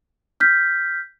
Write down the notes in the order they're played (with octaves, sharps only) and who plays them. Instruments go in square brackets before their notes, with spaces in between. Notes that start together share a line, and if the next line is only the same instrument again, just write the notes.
[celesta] F6 G6 B6